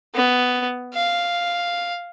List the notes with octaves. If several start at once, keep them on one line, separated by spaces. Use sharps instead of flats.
B3
F5